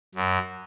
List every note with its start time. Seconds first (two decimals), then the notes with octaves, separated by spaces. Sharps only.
0.15 F#2